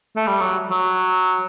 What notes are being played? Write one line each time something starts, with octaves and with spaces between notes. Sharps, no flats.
A3
G3
F#3
F#3